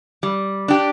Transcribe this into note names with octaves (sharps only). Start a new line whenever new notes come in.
G3
D4 G4